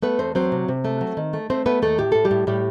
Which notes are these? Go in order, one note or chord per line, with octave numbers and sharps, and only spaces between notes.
A3 B3 B4
E2 C4 C5
F#3 C4 C5
C3
C3
A3
F#3
D#3
A3
A3 C4 C5
A3 B3 B4
D#2 A3 A4
A2 G4
A2 A4
G3 G4
A2
A2 G3 G4